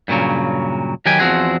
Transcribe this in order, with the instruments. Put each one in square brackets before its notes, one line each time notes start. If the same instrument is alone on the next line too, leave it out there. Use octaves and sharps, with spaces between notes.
[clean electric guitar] G2 A#2 C#3 F#3
D#3 F#3 G4 G5 G#5
E2 F3 C4 F#4 G#4